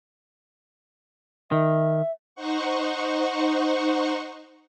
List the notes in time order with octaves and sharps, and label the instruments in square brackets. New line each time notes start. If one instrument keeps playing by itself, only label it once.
[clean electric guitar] D#3 [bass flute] E5
[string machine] D#4 C5 F#5 C#6